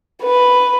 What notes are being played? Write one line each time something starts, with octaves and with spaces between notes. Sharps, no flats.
B4